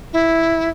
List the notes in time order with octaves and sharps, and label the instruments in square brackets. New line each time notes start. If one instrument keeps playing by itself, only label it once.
[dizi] E4